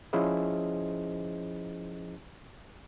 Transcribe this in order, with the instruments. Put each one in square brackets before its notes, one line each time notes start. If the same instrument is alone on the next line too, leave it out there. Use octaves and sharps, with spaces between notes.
[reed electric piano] F3 C#4 E4 G#4 C5 D#5